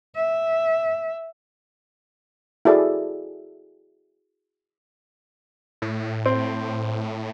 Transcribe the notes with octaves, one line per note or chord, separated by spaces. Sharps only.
E5
E4 F#4 G#4 A4 D5 E5
A2
C4